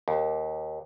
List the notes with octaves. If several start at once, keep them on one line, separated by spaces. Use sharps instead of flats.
D#2